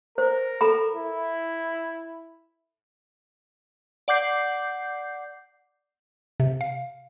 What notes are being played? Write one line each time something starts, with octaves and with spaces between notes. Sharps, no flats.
A#4 C5
A4 A#5 B5
E4
D5 F#5 D6 G6 C7
C3
F5